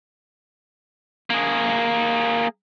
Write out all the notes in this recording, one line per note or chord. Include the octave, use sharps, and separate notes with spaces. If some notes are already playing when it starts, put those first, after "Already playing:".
A#3 G#4